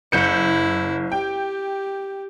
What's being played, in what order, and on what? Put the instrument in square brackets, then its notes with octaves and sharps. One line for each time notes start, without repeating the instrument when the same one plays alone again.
[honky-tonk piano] F#1 G6 C#7 [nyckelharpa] E4
[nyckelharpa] G4 [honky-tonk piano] G5